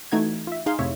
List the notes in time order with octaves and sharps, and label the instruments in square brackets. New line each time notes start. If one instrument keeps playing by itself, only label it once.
[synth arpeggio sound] E3 A3 D#4 F#4 G#6
F4 E5
D#4 G#4 F5 C6
F2 A2 C3 C#5 E5